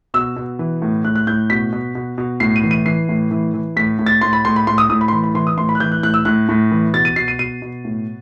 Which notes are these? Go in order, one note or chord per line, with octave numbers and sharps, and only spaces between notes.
B2 E6
B2
E3
A2
A2 F#6
F#6
A2 G6
B2 B6
B2
B2
B2
A2 C7
D#7
E3
D#7
E3 C7
A2
E3
E3
A2 B6
A2
A6
A2 C6
B5
A2 C6
B5
A2 C6
D#6
A2 D#6
B5
C6
E3 B5
B5
E3 C6
D#6
A2 C6
B5
F#6
E3 G6
F#6
A2 F#6
E6
A2 F#6
A2
E3
B2 A6
D#7
B2 C7
D#7
B2 D#7
B2
A2